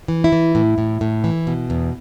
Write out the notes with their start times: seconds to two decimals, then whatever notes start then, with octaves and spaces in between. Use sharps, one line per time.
0.08 E3
0.24 E4
0.32 E3
0.55 A2
0.78 A2
1.01 A2
1.24 E3
1.47 B2
1.70 E2